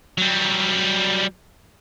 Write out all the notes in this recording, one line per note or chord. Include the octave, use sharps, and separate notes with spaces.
F#3 G3